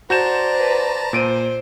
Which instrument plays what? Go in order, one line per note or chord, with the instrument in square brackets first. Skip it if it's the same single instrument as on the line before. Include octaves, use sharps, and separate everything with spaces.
[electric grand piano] F#4 G6 E7 [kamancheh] C5 D5 [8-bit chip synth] A5 A#5
[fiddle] B4
[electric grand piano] A#2 D7 D#7 [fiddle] C5